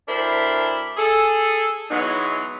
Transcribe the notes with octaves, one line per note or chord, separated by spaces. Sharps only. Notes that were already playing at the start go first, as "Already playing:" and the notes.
D2 D4 E4 A#4 C5
G#4 A4
E3 F#3 G#3 B3 D#4